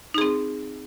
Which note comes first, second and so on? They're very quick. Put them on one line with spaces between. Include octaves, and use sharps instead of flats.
D#4 G#4 C4